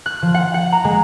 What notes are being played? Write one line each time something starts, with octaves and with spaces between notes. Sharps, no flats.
F#6
F3
F#5
F#5
A#5
G#3